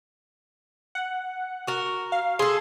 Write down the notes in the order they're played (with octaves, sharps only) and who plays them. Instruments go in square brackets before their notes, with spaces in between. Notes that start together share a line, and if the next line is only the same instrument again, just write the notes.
[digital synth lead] F#5
[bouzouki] F#4 A#4
[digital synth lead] F5
[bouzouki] G#4 A4 [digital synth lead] C6